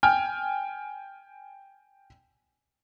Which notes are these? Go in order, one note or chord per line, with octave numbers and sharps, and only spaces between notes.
G5 G#5 F6